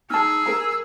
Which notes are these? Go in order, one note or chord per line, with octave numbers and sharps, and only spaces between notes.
D#4 G#4 A5 E6 F6
A#4 A#5